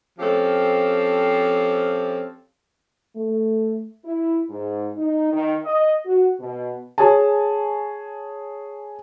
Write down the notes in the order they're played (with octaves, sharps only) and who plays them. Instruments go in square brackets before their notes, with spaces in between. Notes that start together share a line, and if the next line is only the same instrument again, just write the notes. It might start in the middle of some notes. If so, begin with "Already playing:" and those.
[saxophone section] F3 C4 C#4 G4 A4 F5
[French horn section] A3
E4
G#2
D#4
D#3
D#5
F#4
B2
[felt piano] G#4 C#5 G#5 A5